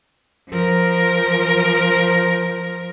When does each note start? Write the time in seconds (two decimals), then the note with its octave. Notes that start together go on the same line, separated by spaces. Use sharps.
0.49 F3 A#4